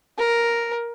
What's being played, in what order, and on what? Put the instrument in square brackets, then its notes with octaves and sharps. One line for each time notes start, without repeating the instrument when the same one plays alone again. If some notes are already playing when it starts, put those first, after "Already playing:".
[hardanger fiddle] A#4